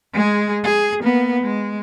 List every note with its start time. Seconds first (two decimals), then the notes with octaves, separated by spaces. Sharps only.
0.13 G#3 G#4
0.64 G#4
1.02 A#3 B3
1.43 G#3